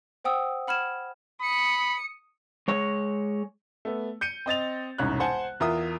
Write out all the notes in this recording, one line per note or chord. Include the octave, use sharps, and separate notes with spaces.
C5 F#5 G5 D#6 E6
F#5 B5 F6 G#6 E7
B5 D#6 C#7
G#3 C#5
A3 B3
G6 C#7 D#7
C4 D#5 A6 F7
E1 C2 G#2 C#4 F#6
C5 F#5 G#5 A5
E2 F4 A#4 E5 D#6